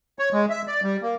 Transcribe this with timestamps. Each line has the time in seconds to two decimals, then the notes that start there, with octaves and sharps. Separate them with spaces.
0.19 C#5
0.33 G#3
0.50 E5
0.68 D5
0.83 G3
1.02 A#3